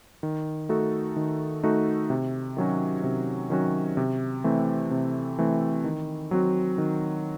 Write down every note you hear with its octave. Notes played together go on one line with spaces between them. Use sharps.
D#3
A3 D#4 F#4 A4
D#3
A3 D#4 F#4 A4
C3
D#3 F#3 C#4 F#4
C3
D#3 F#3 C#4 F#4
C3
E3 A3 C4
C3
E3 A3 C4
D#3
F#3 C4 F#4
D#3